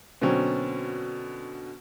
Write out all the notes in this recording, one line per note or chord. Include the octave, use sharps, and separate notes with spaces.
B2 D3 F#3 C4 C#4